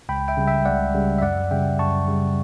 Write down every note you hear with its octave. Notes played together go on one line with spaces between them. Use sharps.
C#2 G5 B5
E5 G5
C#3 G3
E5 G5
C#2 D5 F#5
C#3 G3
E5
F#2 D5 F#5
C#3 G3 E5 G5
F#2 A5 C#6
C#3 G3